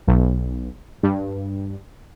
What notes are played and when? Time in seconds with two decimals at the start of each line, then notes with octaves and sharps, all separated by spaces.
0.08 B1
1.03 G2